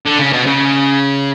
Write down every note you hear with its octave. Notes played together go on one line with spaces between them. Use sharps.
D3
C#3
B2
C#3